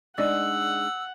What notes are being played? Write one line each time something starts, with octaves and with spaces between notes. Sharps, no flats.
G#3 D4 D#4 D5 D#5 F#5 E6